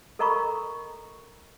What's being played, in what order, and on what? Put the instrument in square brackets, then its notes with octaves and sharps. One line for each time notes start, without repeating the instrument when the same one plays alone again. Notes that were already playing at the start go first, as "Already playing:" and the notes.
[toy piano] A4 A#4 D#5 A#5 B5 C#6